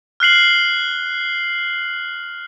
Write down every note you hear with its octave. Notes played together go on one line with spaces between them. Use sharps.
F6 F#6 C7 F#7